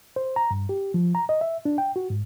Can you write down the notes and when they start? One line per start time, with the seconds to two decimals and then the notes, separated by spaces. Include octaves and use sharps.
0.16 C5
0.36 A#5
0.51 G2
0.69 G4
0.94 F3
1.15 A#5
1.29 D#5
1.41 E5
1.65 D4
1.78 G5
1.96 F#4
2.10 G#2